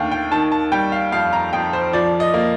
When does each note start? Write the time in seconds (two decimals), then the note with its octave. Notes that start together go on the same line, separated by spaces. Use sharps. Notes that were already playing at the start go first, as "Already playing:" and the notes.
Already playing: D#2 A3 D4 F5 G5
0.12 G5
0.32 D#3 A5
0.52 A5
0.72 G3 G5
0.92 F5
1.12 F2 F5
1.33 A#5
1.53 F2 G5
1.73 C5
1.93 F3 D5
2.20 D#5
2.34 A#3